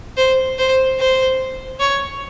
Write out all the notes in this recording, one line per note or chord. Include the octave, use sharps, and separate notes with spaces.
C5
C5
C5
C#5